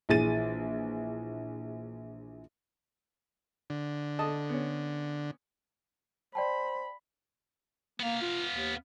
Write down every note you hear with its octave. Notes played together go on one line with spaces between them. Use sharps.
A#1 E3 G#4 A6 D#7
D3
A4 D#5 A5
B3 C#4
C5 D5 G5 A5 B5
A#3 B3 F5
F4
D#2